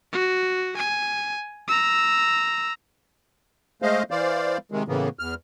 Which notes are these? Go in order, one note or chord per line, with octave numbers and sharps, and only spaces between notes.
F#4
G#5
A#5 E6
G#3 A3 C5 D#5 F5
E3 C5 D5 F5
C3 D#3 G#3
A2 C#3 E3 A#3 B3
E2 F6